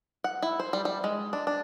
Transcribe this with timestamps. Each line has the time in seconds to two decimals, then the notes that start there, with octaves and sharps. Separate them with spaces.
0.24 F#5
0.42 E4
0.60 C5
0.73 G3
0.85 G3
1.04 G#3
1.33 D4
1.47 D4